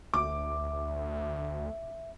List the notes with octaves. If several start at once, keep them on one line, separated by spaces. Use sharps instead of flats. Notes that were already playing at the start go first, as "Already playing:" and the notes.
D2 E5 D6